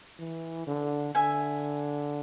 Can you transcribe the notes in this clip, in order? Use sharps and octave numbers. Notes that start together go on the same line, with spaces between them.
E3
D3
D3 E5 G#5